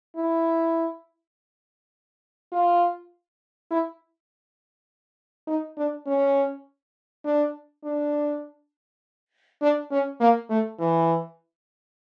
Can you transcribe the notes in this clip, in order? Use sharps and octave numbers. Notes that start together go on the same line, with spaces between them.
E4
F4
E4
D#4
D4
C#4
D4
D4
D4
C#4
A#3
A3
E3